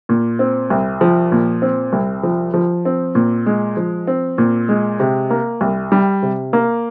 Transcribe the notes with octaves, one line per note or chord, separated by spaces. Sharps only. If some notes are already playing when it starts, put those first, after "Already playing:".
A#2
C4
C2
F3
A#2
C4
C2
F3
F3
C4
A#2
G#3
F3
C4
A#2
G#3
C3
A#3
C2
G3
C3
A#3